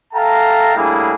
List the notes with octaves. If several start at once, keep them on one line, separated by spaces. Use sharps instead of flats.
A4 E5 F5 G5 A5 A#5
A2 G3 A#3 D4 E4 G#4